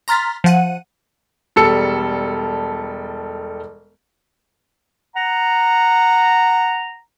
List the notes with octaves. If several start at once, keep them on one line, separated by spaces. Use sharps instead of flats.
A#5 C6 F6 A6 B6
F3 F#5 D#7
E1 G3 A4 E6 C#7
F#5 A#5